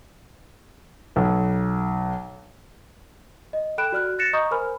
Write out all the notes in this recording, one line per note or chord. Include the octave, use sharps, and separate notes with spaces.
B1
D#5
A4 G5 B5 F#6 D7 E7
F#4 D5 F6 F#6
F#6 A6 A#6 C#7 E7
D#5 A#5 C#6 D#6 G6
A#4 C5 G#5 B5 F6